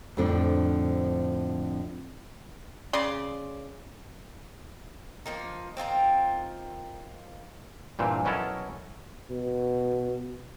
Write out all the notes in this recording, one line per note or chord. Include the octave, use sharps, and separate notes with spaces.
F2 A2 D3 F3 C4 D4
C#3 D5 C6
F3 A#3 D#4
C4 D#4 F4 A#4
G2 A#2 E3 C4
B2 F#3 C#4 E4 A4 A#4
B2